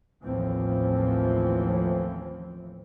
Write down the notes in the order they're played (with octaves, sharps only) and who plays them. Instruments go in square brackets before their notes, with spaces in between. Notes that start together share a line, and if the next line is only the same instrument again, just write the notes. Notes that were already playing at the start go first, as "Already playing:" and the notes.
[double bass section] A1 D#2 A2 E3 F3 C4